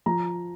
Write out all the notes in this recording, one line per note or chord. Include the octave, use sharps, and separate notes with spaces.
F3 A#5